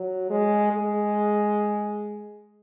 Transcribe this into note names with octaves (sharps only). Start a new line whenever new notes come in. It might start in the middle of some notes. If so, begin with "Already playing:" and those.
Already playing: F#3
G#3
G#3